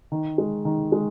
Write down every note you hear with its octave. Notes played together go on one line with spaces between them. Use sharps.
D#3
G#3
D#3
G#3